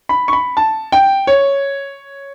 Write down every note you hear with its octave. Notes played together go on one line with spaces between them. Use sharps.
B5
C#6
B5
A5
G5
C#5